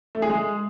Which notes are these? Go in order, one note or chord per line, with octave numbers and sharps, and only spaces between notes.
A3
G#4
G#3